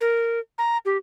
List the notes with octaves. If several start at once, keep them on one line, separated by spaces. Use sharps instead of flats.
A#4
A#5
G4